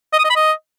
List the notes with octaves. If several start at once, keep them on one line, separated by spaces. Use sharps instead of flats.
D#5
D#6
D#5
B5
D#5